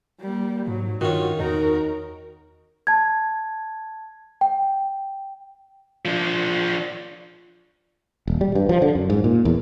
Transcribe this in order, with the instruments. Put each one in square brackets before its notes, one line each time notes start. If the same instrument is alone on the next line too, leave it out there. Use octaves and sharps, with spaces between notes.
[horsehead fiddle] G3 A#3
[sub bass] G#2 [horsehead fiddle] F#3
[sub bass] G2 [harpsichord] D#3 C#4 [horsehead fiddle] F4 [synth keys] F#4
[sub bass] E2 [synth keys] D#4 [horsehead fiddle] F#4 A#4
[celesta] A5 G#6
G5
[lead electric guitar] F3 D4
[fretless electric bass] D#1
G3
G2
F3
D3
F#2
G#2
A#2
E2